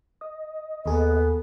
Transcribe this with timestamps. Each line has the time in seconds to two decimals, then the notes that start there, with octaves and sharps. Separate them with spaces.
0.21 D#5
0.86 D#2 B3 G#4 A4